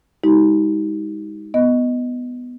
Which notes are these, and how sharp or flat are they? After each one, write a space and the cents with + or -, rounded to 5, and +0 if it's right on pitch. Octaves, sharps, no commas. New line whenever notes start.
G#3 -25 D#4 +30 G4 -35
B3 +5 D#5 +0